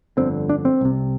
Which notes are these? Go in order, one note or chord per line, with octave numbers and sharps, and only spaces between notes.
G1 F2 D3 C4
D4
C4
C2 C3